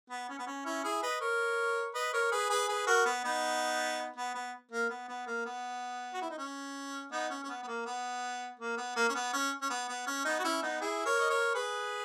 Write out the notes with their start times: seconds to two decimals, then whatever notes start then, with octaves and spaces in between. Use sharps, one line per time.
0.10 B3
0.29 C#4
0.39 B3
0.47 C#4
0.65 C#4 E4
0.83 E4 G#4
1.02 B4 D#5
1.21 A#4 C#5
1.94 B4 D#5
2.13 A#4 C#5
2.32 G#4 B4
2.50 G#4 B4
2.69 G#4 B4
2.87 F#4 A#4
3.05 B3
3.24 B3 D#4
4.16 B3
4.35 B3
4.71 A#3
4.90 B3
5.08 B3
5.27 A#3
5.45 B3
6.14 F#4
6.22 E4
6.30 D#4
6.38 C#4
7.11 B3 D#4
7.30 C#4
7.44 C#4
7.49 B3
7.63 B3
7.67 A#3
7.86 B3
8.59 A#3
8.77 B3
8.96 A#3
9.09 C#4
9.15 B3
9.33 C#4
9.62 C#4
9.70 B3
9.88 B3
10.07 C#4
10.25 B3 D#4
10.39 F#4
10.44 C#4 E4
10.62 B3 D#4
10.81 E4 G#4
11.05 A#4 C#5
11.20 D#5
11.30 A#4 C#5
11.55 G#4 B4